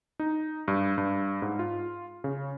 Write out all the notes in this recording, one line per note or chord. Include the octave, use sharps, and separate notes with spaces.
D#4
G2
G2
G#2
F4
C#3